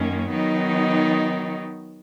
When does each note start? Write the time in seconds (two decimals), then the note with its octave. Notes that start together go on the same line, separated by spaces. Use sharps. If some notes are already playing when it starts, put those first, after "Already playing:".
Already playing: F#2 D#3 A#3 C#4
0.30 D#3 F#3 B3 D#4